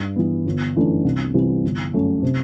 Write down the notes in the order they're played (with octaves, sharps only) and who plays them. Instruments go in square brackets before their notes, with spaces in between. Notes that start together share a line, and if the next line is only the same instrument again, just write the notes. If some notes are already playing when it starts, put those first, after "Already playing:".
Already playing: [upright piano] G2
E3 B3
G1
F#2 E3 A3 D4
C2
C3 E3 G3 C4
G1
F#2 F#3 A3
C3